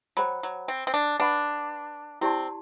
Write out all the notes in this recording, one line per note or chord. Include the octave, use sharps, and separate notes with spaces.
F#3 C5 G5 B5
F#3
C4
C4
D4
D4 B4 F#5 B5
C4 E4 G4 D5 A5 C6